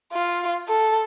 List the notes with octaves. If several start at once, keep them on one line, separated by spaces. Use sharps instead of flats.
F4
A4